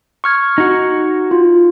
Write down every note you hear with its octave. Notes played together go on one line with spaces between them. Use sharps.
C#6 F6 G#6
D#4 F#4
F4